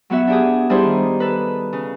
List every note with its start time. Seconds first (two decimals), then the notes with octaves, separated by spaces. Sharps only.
0.10 F#3 B3 F#4 E5
0.27 D4 G4 G#4
0.70 G3 D4 E4 G4 G#4 C5
0.83 D#3
1.20 A4 B4
1.73 C#3